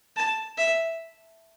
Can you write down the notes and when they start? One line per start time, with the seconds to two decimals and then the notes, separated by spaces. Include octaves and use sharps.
0.16 A5
0.57 E5